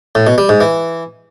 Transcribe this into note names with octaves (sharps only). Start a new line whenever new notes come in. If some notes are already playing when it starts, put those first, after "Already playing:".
A2
B2
G3
G#2
E3